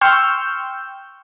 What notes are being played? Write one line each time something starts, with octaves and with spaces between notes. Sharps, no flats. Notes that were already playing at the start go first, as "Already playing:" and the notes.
G5 C6 C#6 E6 F6 G6